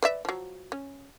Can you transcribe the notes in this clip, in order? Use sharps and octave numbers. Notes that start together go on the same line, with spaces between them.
B4 D5 E5
F3 F#3
C#4